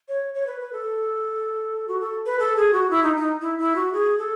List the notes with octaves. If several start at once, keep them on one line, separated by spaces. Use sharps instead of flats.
C#5
C#5
B4
B4
A4
F#4
A4
B4
A4
G#4
F#4
E4
D#4
D#4
E4
E4
F#4
G#4
A4